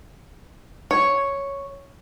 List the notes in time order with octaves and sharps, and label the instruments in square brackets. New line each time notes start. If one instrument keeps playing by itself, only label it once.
[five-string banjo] C#5